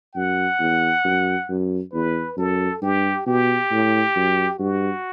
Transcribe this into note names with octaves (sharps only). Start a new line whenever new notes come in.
F#2 F#5
E2
F#2
F#2
E2 B4
F#2 A4
G2 G4
B2 G4
A2
F#2
G2 F#4